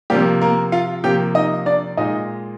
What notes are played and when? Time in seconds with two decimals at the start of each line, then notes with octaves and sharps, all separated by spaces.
0.10 C3 F3 G3 A#3 G4
0.41 A#3 A#4
0.72 F4 F5
1.04 C3 F3 A#3 G4 G5
1.35 D#4 D#5
1.66 D4 D5
1.97 A#2 G#3 D#4 D#5